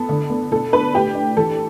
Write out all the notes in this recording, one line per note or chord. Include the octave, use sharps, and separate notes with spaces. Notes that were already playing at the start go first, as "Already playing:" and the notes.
Already playing: B3 A4
D3
B3
B2 A4
D4 B4
A2 G4
D4
E3 A4